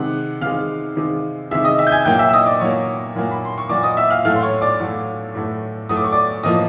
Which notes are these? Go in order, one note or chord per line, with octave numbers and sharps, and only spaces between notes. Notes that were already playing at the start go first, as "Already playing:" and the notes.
Already playing: C3 D#3 G#3 F#5 F#6
C3 D#3 G#3 F5 F6
C3 D#3 G#3
C3 D#3 G#3 E5 E6
D#5 D#6
E5 E6
G6
G#5 G#6
A#2 F#3 A#3 G5 G6
E5 E6
E6
D#5 D#6
D5 D6
A#2 F#3 A#3 C#5 C#6
A#2 F#3 A#3
B5
C6
C#6
A#2 F#3 A#3 D5 D6
D#5 D#6
E5 E6
F5 F6
A2 F#3 A3 F5 F6
C6
C#5 C#6
D5 D6
A2 F#3 A3
A2 F#3 A3
A2 F#3 A3 D#6
D6
C#6
D5 D6
A2 F3 A#3 D#5 D#6